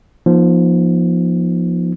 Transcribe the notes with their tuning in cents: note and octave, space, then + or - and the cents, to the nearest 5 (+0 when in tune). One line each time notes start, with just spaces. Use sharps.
F3 +0 B3 -40 D#4 +0